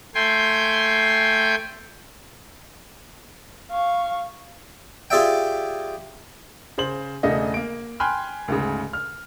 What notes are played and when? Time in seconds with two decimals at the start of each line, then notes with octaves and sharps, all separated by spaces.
0.15 A3 G5 G#5 C6 G6
3.71 F5 C#6
5.10 F4 G4 G#4 D5 E5 G5
6.78 C#3 C5 F#7
7.23 E1 C#3 A3 D4 D#5
7.54 A#3 D7
8.00 G5 G#5 B5 C6 F6 F#6
8.48 D2 G#2 C#3
8.93 F6